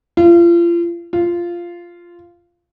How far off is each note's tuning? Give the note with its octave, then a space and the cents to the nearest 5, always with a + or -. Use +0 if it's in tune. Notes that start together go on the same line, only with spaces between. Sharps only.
F4 -35
F4 -10